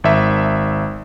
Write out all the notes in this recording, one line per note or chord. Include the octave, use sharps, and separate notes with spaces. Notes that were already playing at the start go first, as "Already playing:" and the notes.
G#1 E5